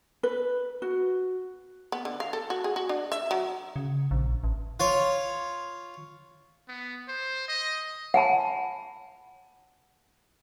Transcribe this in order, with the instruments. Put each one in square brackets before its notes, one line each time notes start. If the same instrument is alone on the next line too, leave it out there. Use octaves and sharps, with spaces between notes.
[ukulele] B4
F#4
[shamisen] B3
D3
F5
A4
F#4
G#4
F#4
D4
E5
F#3
[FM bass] C#3
A#1
A1
[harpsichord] F4 C#5
[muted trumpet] B3
C5
D#5
[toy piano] F#5 G#5 A5 B5